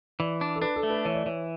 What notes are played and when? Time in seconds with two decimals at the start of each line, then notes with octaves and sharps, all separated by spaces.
0.20 E3 D5
0.41 D4
0.56 A4
0.62 D4 B4
0.76 A4
0.83 A3
0.90 B4
1.05 E3 C#5
1.14 D5
1.24 E3 C#5